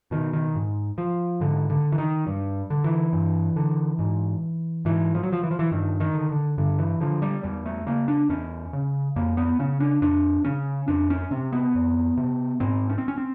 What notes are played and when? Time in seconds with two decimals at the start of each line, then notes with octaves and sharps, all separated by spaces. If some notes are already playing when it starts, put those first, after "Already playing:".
0.11 B2 D#3
0.33 D#3
0.55 G#2
0.98 F3
1.40 G#2 D3
1.70 D3
1.92 E3
1.98 D#3
2.27 G2
2.70 D3
2.84 E3
3.13 G2
3.56 D3
3.99 G#2
4.85 G#2 E3
5.15 F3
5.23 F#3
5.32 F3
5.43 E3
5.51 F3
5.59 E3
5.71 G2 D#3
6.00 D#3
6.14 D3
6.29 D3
6.58 G2 D3
6.79 E3
7.00 D3 F3
7.22 G3
7.43 E2 G3
7.66 A3
7.87 C#3 A#3
8.08 D4
8.29 E2 C#4
8.73 C#3
9.16 F2 A#3
9.37 B3
9.59 C#3 C#4
9.80 D4
10.02 F2 D4
10.45 C#3 C#4
10.88 F2 D4
11.10 C#4
11.31 C3 C4
11.52 B3
11.75 F2
12.17 C3
12.60 G#2 C4
12.90 C#4
12.98 C4
13.08 C#4
13.18 C4